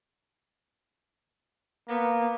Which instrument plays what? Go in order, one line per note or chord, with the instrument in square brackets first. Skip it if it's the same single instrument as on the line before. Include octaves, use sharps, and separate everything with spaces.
[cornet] A#3 [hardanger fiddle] B3